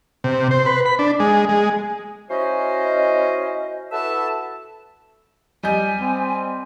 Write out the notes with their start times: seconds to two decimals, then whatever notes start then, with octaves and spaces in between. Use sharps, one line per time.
0.24 C3
0.51 C5
0.66 B4
0.86 B5
0.99 D4
1.20 G#3
1.49 G#3
2.29 C#4 E4 F#4 C5 D#5
3.91 E4 F#4 A4 B4 E5 A5
5.63 G3 D#5 G#5 G6
6.00 C4